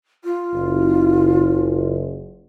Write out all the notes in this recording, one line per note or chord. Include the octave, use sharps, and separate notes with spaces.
F4
F#1